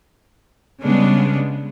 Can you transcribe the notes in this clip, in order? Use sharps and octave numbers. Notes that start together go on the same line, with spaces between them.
C#3 G3 G#3 B3 D4